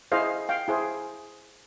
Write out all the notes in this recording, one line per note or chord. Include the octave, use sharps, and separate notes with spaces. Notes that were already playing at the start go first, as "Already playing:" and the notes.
E4 G#4 C5 D#5 F5
F5 G5
E4 G#4 C5